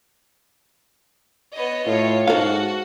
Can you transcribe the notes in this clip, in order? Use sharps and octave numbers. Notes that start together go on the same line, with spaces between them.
B3 C#5 D#5
A2 F4 C#5
G#2 F#4 A4 F5